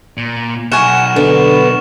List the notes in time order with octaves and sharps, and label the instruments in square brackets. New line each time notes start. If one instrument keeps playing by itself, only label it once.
[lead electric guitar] A#2
[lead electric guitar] B1 [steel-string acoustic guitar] F#5 G#5 [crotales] C#6 F6 E7
[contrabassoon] D3 [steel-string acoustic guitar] B3